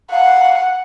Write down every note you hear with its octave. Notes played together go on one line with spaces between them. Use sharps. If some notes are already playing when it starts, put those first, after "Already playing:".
F5 F#5